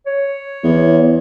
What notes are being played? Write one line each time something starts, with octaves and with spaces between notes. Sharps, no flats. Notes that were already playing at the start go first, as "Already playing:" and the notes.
C#5
E2